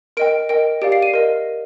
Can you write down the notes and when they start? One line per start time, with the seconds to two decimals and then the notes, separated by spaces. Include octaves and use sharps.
0.17 A#4 D#5 G5 D7
0.49 A#4 D#5 G5 D7
0.82 G4 D5 F5 D7
0.92 C7
1.03 D#7
1.14 A#4 D#5